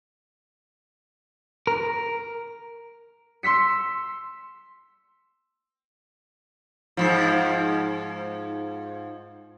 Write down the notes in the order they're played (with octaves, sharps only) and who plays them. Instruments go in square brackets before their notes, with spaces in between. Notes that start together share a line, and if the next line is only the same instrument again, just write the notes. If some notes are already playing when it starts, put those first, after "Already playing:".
[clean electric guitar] A#4
[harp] C6 E6 B6 C#7
[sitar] G#2 B2 F3